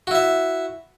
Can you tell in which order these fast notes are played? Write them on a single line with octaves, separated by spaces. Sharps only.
F#4 E4 E5